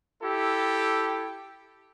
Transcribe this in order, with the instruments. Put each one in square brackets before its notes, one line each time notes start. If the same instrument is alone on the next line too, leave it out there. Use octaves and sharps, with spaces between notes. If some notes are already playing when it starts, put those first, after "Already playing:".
[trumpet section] E4 G4 A4